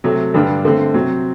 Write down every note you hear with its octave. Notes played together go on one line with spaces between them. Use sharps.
C3 F#3 A3 C4
G2 D3 G3 D4
D3 A3 C4
C3 F#3 C4